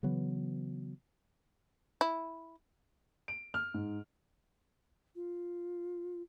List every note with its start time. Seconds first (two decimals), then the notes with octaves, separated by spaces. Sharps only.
0.03 C#3 E3 F#3 B3
2.01 E4
3.28 D7
3.54 F6
3.74 G#2
5.16 F4